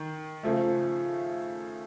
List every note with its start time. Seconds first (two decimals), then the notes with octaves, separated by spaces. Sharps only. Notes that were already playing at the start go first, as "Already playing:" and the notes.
Already playing: D#3
0.43 C#3 F3 A3